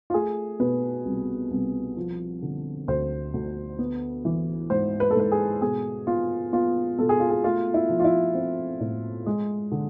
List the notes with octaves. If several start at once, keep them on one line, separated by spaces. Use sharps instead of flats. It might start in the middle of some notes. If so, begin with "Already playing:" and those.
F4
A3 G#4
B2 B4
C2
C2
F3
D3
D2 C5
D2
B3
E3
G#2 C5
B4
A4
G#2 B4
G#4
B2 G#4
B3 F4
B3 F4
B2 A4
G#4
F4
G#4
A3 F4
E4
F3
F4
E4
C4
A2
G#3
D3